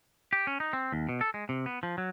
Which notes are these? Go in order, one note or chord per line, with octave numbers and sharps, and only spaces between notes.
G4
C#4
D#4
C4
D#2
B2
A4
G#3
C3
B3
F3
F#3